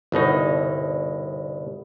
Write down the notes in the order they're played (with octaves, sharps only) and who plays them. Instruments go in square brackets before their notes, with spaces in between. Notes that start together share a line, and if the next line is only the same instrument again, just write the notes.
[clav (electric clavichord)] G1 C2 B2 D#4